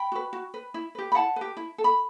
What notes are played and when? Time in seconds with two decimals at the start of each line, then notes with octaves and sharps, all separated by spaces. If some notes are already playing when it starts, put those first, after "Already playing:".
Already playing: G5 B5
0.12 F#4 B4
0.33 F#4
0.54 B4
0.74 E4
0.95 G4 B4
1.12 B5
1.15 E4 F#5 A5
1.36 G4 B4
1.57 E4
1.78 A4
1.84 B5